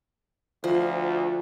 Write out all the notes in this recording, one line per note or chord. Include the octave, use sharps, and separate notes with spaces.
D2 F3